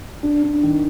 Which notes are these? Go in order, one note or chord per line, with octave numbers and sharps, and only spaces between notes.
D4
D4
D#3